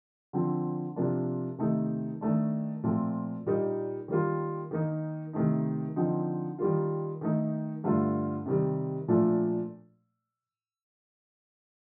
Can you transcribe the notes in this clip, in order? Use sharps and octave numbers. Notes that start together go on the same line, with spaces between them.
D3 F3 C4
C3 F3 A#3 D4
C3 D#3 A3 D#4
D#3 A3 D4
A#2 F3 A3 C4
A#2 G3 A#3 D#4
D#3 G3 A#3 F4
D#3 A#3 D#4
C3 D#3 A3 D#4
D3 F3 C4 D#4
D#3 G3 A#3 F4
D#3 A3 D#4
G2 D3 A3 D4 F4
C3 D#3 G3
A#2 F3 A3 D4